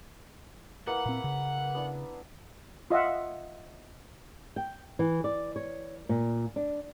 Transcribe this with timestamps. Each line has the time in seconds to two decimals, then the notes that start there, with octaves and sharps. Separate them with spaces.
0.87 A#3 E4 B4 F#5
1.06 A#2 C4
1.24 C#3
1.75 B3 D4 E4
2.90 F4 D#5 E5 F#5
4.56 G5
4.99 E3
5.24 D5
5.56 C#5
6.09 A#2
6.56 D4